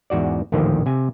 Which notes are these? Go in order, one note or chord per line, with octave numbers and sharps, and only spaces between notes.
E2 G#2 F#4 D5
A#1 D#2 A2 D3 D#3 F3
C3 G#5